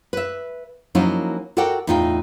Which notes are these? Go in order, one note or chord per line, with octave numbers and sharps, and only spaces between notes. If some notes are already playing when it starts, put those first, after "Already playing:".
B4 E5
F3 F#3 A#3 C#4 D#4 E4
F#4 A4 A#4 D5 F#5 G5
E2 A2 D#4 F4 F#5 G5